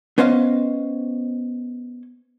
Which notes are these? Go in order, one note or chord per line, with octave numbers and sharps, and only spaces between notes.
B3 C#4 C5 D#5 F5